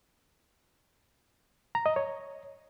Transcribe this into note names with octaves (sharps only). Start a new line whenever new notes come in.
A#5
D#5
C#5